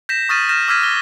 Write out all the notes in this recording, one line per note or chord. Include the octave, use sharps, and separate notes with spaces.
G6 A#6 B6 E7
C#6 D#6 F6 A6 B6 D#7
F6 G6 A#6 E7
D6 E6 F6 G#6 B6 D#7
A#6 G7